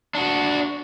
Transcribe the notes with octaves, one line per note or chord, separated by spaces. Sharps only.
D4 F#4